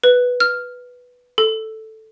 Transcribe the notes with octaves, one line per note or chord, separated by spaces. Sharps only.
B4
F6
A4